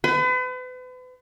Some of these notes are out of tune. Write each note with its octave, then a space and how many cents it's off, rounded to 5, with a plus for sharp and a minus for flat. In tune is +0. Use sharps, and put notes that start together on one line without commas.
B4 +40